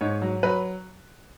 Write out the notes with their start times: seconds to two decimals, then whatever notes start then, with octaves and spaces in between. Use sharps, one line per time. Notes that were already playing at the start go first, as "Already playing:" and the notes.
0.01 G#2 C#5
0.22 F#3
0.43 F#3 B4